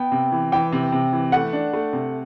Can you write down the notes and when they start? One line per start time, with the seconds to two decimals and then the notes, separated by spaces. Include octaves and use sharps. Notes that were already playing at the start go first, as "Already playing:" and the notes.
Already playing: B3 G5
0.12 C3
0.32 E3
0.52 E3 G5
0.72 C3
0.92 C3
1.13 E3
1.32 A3 F#5
1.53 D4
1.73 A3
1.93 C3